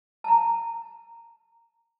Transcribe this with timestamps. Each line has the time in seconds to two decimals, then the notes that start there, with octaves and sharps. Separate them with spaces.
0.24 A5 A#5